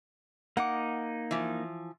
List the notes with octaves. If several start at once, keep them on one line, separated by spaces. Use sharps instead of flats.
A#3 D#4 F#5 D6
E3 F3